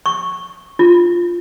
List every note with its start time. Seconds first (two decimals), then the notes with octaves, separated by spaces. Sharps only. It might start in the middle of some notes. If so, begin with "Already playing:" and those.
0.06 C#6
0.79 F4